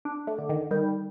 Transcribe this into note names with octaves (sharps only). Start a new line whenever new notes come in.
D4
A3
D3
D#3
D#3 G3